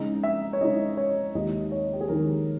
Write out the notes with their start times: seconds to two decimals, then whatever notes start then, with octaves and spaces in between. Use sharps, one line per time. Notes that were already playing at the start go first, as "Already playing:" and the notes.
Already playing: C#3 G#3 D#4
0.23 E5
0.53 C#5
0.61 C#3 G#3 D#4 D#5
0.97 C#5
1.35 D#2 D#3 G#3 D#4 D#5
1.72 C#5
1.93 G4
2.01 G#4
2.09 D#2 D#3 G#3 D#4 A#4